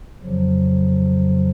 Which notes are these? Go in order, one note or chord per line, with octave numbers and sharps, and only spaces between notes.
F2 C#3 F3 F#3